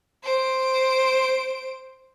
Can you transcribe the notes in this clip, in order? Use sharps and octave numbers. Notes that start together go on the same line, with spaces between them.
C5 D7